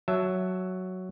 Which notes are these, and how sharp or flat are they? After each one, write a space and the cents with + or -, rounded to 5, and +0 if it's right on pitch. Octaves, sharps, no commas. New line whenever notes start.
F#3 +0 E5 +0 A5 +0